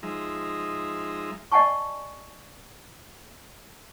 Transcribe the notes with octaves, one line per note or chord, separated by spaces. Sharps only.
F3 G#3 D#4 E5 A#5
D5 D#5 F#5 G#5 A5 C#6